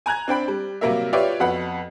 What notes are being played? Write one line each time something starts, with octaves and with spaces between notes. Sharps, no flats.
G#5 A#5 F#6 G#6
C4 D4 G5 B5
G3
C3 F#3 G3 A#3 A#4 E5
F4 G4 B4 C#5 D5 E5
F2 B3 F#4 F#5 B5